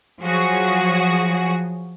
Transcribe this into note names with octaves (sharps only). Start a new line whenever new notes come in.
F3 F#3 F#4 G#4